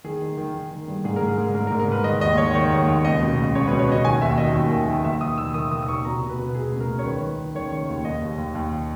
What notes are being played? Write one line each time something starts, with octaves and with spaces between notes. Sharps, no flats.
D#3 G#4
D#3
D#3
D#3
D#3
G2
G#2 G#4
G#2 A#4
G#4
G#2
G#2 A#4
A#4
G#2
A#4
G#2 B4
D#3 D#5
D#2 D#5
D#3 C#5
D#3 C#5
D#2
D#2
C#2 D#5
B2
C#2
C#2 C#5
B4
B2
C#5
B2 D#5
D#3 G#5
D#2 E5
D#3 D#5
D#2
D#3
D#3
D#2 E5
D#3 D#6
D#3 E6
D#3 D#6
D#3 D#6
D#6
D#2 C#6
B2 A#5
B2
B4
B2
B2 G#4
C#2
A#4
C#2
C#5
D#3 B4
D#3
D#3
D#3 C#5
D#3
D#2
D#2 D#5
D#2
D#2
D#2